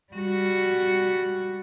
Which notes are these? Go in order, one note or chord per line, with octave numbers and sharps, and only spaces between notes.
G3 F#4